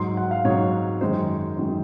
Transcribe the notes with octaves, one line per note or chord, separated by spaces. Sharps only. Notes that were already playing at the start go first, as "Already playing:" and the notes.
Already playing: G#2 F#3 C6
F#5
F5
G#2 F#3 C#5
F#2 D#3 G#3 C5
F#2 D#3 G#3